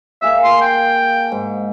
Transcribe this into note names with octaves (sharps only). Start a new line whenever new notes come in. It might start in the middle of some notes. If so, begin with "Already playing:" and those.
A#3 G#4 E5 F5
C6
G5
G#2